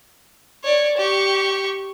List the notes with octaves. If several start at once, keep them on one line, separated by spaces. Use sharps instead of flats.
C#5 D5
G4 C#6